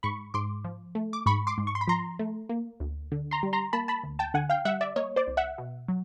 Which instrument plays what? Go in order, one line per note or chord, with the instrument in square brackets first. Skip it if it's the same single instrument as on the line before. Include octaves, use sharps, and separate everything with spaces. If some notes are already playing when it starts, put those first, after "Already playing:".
[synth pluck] G#2 B5 C#6
G#2 C6 D6
F3
A3
D6
G#2 B5 C#6
C6 D6
G#2
C#6
C6
B5
F3 A#5 C6
A3
A#3
D2
D3
A#5 C6
G3
A#5 C6
A#3 A5 B5
A5 B5
D2
G5 A5
D3 F#5 G#5
F5 G5
G3 E5 F#5
D5 E5
A#3 C#5 D#5
C5 D5
C2
E5 F#5
B2
F#3